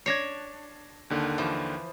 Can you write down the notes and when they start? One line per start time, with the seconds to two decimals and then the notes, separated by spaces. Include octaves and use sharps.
0.06 D4 C#5 G#6 A#6 C7
1.10 D#2 D3 D#3
1.38 E3 F3